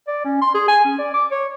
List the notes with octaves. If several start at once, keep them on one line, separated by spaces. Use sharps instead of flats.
D5
C#4
C6
G#4
G#5
C#4
D5
D6
C#5